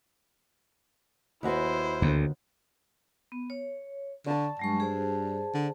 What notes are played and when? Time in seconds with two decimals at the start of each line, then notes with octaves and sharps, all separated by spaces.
1.43 D#2 E4 F#4 B4 C5
2.02 D2 D3 A#3
3.32 B3
3.50 C#5
4.26 D3 D5 A5 C#6
4.59 G2 F#3 G#3 C#6
4.80 G#4 C5
5.54 D3